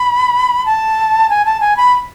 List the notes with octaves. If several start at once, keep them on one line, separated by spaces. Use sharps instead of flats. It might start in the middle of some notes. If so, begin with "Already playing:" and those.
Already playing: B5
A5
G#5
A5
G#5
B5